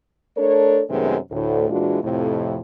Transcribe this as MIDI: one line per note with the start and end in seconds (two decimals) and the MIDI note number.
0.37 0.81 57
0.37 0.81 62
0.37 0.81 69
0.37 0.81 70
0.37 0.81 73
0.90 1.17 42
0.90 1.17 48
0.90 1.17 51
0.90 1.17 56
0.90 1.17 57
0.90 1.17 59
1.31 1.68 38
1.31 1.68 45
1.70 1.98 46
1.70 1.98 52
1.70 1.98 56
1.70 1.98 62
1.70 1.98 65
1.70 1.98 66
2.03 2.59 41
2.03 2.59 45
2.03 2.59 48